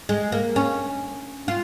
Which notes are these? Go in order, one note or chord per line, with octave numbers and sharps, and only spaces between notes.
G#3
A#3
C#4
F4